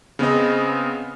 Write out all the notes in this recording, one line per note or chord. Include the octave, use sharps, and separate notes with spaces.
C#3 B3 C4 D#5